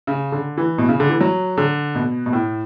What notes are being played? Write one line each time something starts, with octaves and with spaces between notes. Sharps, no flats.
C#3
D3
E3
B2
C#3
D3
E3
F#3
D3
B2
B2
A2